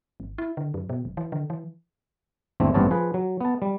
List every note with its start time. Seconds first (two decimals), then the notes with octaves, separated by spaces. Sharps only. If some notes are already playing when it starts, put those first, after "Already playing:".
0.20 G#1
0.38 E4
0.57 D3
0.74 F#2
0.89 B2
1.05 F1
1.17 E3
1.32 D3
1.50 E3
2.60 G#1 E2 D3 A3 C4
2.74 A1 G2 B3 C4 C#5 A5
2.91 F3 G#4 B4
3.14 F#3
3.41 B3 A5
3.62 G3